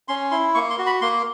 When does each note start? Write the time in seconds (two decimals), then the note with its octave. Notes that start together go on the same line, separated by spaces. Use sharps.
0.08 C#4 C6
0.31 E4 C6
0.55 A#3 C#6
0.70 C6
0.78 F#4
0.86 B5
1.01 A#3 C6